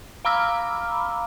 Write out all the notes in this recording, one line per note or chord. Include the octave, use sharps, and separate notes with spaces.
F5 A#5 B5 D6 E6 F6